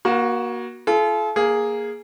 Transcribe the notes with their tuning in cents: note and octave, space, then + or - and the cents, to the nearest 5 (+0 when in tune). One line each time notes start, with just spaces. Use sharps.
A#3 +30 F#4 +0
F4 -35 A4 -45
A#3 +0 G#4 +0